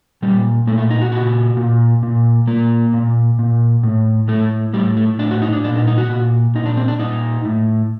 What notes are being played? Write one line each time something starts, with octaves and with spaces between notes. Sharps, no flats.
A#2 G3
A#2 A3
A3
D#4
F#4
A#2 F#4
A#2
A#2
A#2 A#3
A#2
A#2
A2
A2 A3
A2 G3
A3
A2 D4
F#4
D#4
D4
A#2 D4
D#4
D#4
F#4
A#2
A#2 D#4
D4
C4
D4
A#2 D#4
A2